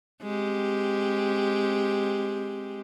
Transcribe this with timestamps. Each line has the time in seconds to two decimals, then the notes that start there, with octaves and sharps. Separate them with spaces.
0.22 G#3 C4 G4